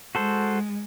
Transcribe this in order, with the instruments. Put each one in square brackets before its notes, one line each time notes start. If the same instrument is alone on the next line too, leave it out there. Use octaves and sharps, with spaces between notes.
[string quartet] G#3 [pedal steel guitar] F#4 A4 C5